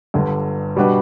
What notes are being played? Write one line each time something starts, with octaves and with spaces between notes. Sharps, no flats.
G1 G2 D3
B2 G3 D4 F#4 B4